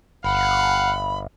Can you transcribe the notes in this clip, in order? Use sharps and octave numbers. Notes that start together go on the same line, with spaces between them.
G1 F5 F#5 B5